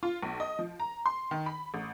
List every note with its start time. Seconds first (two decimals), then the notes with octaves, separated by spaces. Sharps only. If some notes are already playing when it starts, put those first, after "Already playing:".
0.03 F4
0.23 B1
0.40 D#5
0.59 F3
0.80 A#5
1.06 C6
1.31 D#3
1.46 B5
1.74 A1